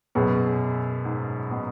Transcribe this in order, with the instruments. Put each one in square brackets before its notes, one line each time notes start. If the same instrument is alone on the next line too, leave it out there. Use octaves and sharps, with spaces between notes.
[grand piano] F#2 B2 [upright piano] B3 G#4 B4
[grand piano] G#2
B2